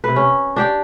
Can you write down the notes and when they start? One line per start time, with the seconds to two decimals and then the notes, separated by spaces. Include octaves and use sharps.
0.04 C3 B4
0.16 C#4
0.56 D4 G4 G5